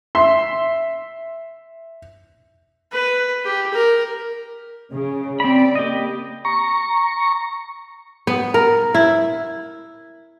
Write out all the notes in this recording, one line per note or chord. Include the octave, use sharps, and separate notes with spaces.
E5 C6
B4
G4
A#4
C#3
C4 D5 B5
A#3 G4 D#5
A#5 C#6
B3
A#4
E4